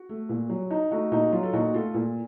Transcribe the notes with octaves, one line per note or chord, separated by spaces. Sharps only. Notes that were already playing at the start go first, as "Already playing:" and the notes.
Already playing: F#4
A3
A#2
F#3
D#4
A3 D#4 F#4
A#2 D#4 F#4
F#3 F4
A4
A#2 D#4 F#4
A3 F4 A4
A#2